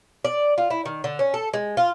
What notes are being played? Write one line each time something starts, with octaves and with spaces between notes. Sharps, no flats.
D5
F4
E4
D#3
D3
C#4
A4
G#3
F4